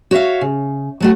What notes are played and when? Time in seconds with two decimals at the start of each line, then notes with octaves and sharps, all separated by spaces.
0.11 F#4 C#5 D5 E5 F5
0.41 C#3
1.00 F#3 A3 F#4